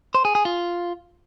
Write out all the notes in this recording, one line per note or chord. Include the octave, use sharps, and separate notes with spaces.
C5
G#4
G#4
F4